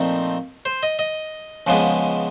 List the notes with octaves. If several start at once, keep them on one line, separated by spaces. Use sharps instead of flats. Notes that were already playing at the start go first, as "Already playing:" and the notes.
Already playing: A#2 F3 A3 C4 D#4
C5
D#5
D#5
C#2 C#3 F3 G#3 B3